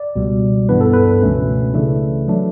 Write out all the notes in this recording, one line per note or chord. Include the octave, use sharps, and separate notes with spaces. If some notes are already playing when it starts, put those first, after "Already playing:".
Already playing: D5
C#2 B2 G3
G2 E3 B3 D4 B4
A4
B4
C#2 B2 A3 C#4
C#3 E3 A3 D4
F#3 A3 D4